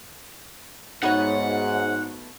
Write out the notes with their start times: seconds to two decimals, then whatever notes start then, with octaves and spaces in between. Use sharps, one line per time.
1.03 G#2 A3 B3 D#4 F#4 C#5 F#5